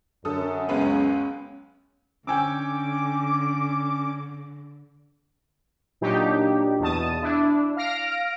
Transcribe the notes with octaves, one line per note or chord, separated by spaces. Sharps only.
F#2 D3 A4 D#6
C#2 G#3 B3 C#4
D3 C#4 G5 G#5 D6 E6
A#2 F#3 D4 D#4 G4
E2 B2 A5 D#6
D4 E4
F5 F6 A#6 D7